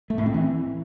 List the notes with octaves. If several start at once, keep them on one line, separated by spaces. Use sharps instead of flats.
A3
A2
C4
E3